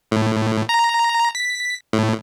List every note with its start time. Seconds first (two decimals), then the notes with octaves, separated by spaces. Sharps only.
0.11 A2
0.69 A#5
1.35 B6
1.93 A2